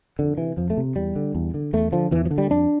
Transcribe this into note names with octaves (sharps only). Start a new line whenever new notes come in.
F2 D3
C3 E3
F2 F3
A3
C3
E2 G3
D3
E2
D3
E2 A3
D3 F3
E2 E3
F3
D3
G3
F2 D4